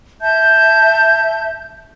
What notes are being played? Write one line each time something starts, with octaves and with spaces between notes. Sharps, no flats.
E5 A5 G6